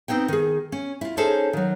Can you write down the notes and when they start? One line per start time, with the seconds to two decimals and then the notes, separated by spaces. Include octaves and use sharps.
0.08 B3 C4 D#4 C#5 G5
0.28 D#3 G#4
0.72 C#4
1.01 E4 F4
1.17 C#4 D#4 G#4 A4 C5 C#5
1.53 D#3 F#3